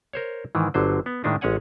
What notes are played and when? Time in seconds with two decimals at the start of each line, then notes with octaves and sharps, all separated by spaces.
0.13 A#4 C5 C#5
0.55 G#2 D#3 E3
0.74 G1 D3 F#3 C5
1.06 B3
1.24 A2 D#3 G#3 D4 D#4
1.41 A1 G#3 C#4 C#5 F#5 G#5